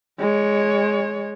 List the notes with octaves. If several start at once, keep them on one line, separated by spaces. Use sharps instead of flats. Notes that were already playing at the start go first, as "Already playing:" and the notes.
G#3 C#5